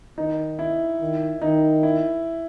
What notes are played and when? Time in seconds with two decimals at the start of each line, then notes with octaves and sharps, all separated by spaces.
0.18 D#3 D#4
0.59 E4
1.01 D#3
1.42 D#3 D#4
1.83 E4